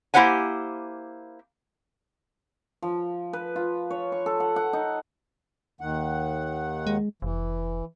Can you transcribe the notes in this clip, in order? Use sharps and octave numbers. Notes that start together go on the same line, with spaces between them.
A#3 E4 G4 C5 F#5 G#5
F3
B4
F4
C#5
C#6
A4
F#5
F#5
D#4
D#2 D#3 F#5
G#3
F1 E3